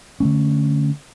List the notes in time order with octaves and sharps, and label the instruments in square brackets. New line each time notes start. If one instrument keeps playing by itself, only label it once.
[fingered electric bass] D3 A3 C#4